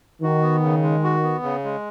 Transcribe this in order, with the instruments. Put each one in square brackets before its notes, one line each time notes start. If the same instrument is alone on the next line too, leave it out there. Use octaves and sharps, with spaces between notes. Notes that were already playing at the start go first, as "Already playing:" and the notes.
[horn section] D#3 [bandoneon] F#4
[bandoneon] B3
C#3
G#3
F#4
B3
C#3
G#3